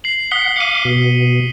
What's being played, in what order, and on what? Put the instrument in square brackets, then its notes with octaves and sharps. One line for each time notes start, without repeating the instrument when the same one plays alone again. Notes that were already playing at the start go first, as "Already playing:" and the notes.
[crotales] C7 F#7
[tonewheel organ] F#5 [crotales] D#6 B6 G7
[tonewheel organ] F5 D6 [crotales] C#7 D#7
[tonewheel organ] B2